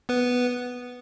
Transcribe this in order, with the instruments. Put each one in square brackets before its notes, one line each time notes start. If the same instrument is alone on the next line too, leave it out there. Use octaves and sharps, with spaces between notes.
[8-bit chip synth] B3 B4